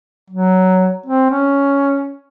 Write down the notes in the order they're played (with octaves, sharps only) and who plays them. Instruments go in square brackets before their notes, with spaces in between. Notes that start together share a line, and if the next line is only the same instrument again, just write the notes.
[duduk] F#3
C4
C#4